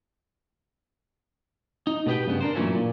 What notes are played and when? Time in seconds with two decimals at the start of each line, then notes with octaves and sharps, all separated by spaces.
1.87 D#4
2.06 B2 A3 B3 G4 B4 G5
2.27 G2 C#3 B3
2.41 D4 A#4 C5
2.55 G2 A#2 E3 F#3 A3 C#4
2.75 A#2